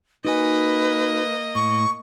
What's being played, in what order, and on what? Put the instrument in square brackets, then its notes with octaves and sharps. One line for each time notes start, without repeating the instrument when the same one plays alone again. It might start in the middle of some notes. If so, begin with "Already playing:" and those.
[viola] A#3 D#5 [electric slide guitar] D#4 F#4 G#5 [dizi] B4
[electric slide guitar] A2 [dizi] C#6